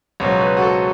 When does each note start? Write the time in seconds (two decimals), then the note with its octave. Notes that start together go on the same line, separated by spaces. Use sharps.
0.20 C#2 B2 F#3 C#5
0.41 B4
0.57 F#4
0.62 A4